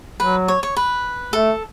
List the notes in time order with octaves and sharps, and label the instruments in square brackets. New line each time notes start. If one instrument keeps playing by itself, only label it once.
[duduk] F#3 [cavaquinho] B4
[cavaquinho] C#5
C#5
B4
[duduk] A3 [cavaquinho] A4